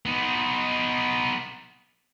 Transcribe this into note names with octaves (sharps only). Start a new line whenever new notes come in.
B3 D#4